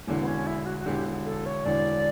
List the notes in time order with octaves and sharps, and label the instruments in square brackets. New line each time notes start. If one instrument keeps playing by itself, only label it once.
[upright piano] E1 E2 D3
[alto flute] B3
C#4
E4
F#4
F#4
[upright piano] E1 E2 D3 [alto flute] G4
[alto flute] A4
C#5
[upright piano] E1 E2 D3 [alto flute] D5